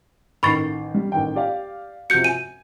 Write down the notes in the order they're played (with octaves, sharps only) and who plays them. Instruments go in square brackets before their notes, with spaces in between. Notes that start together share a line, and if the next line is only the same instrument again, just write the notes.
[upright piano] A1 D#3 C7 [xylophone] B5 C#6 A6
[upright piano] G3
A1 D#3 G5
G4 D5 F5
[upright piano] C3 F3 F#4 [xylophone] G6 C#7
[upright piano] G#5 [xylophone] D#7